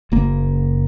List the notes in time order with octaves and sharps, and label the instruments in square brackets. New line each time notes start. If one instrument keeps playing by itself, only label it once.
[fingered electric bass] F#1 F#2 A#3